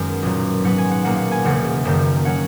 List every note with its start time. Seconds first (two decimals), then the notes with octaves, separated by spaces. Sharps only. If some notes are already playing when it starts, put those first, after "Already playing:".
Already playing: F#2 D#3 G#3 B3
0.22 B1 A#2 F#3
0.64 G#2 F#3 B3 F#5
0.78 G#5
0.91 F#5
1.05 B1 A#2 A#3 F#5
1.18 F#5
1.31 G#5
1.44 E1 E2 C#3 F#5
1.85 F#1 F#2 D#3
2.25 F#3 C#4 F#5